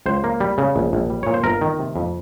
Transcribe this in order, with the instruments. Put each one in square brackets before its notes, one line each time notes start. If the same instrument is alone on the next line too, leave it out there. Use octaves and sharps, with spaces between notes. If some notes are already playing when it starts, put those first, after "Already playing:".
[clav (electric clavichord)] C#2 C5
A#3
G3
C#3
A#1
A#1
G3
A#2 C#5
C5
G1 A#4
D#3
C3
F2